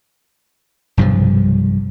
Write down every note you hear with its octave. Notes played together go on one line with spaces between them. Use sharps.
B1 G2 C3 F3